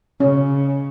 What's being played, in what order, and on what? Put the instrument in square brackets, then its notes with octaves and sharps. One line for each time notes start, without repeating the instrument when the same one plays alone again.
[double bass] C#3 [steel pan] C#4